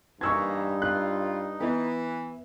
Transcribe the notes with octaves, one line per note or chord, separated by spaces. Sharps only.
G2 E3 A#3 D#4 C#6 E6 G#6
F4 F#6
E3 B3 E4